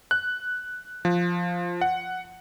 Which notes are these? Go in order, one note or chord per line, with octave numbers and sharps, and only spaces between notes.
F#6
F3
F#5